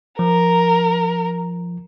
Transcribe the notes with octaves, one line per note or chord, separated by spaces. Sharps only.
F3 A#4